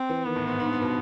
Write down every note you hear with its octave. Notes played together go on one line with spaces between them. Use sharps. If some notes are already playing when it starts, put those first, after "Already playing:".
Already playing: C4
E3
D#3 B3
A2
G#2
G#2
G2
G#2
B2